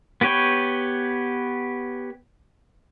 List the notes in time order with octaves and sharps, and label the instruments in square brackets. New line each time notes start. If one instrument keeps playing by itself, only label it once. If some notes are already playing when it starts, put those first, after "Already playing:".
[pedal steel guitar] B3 G4 B4 C#5 G5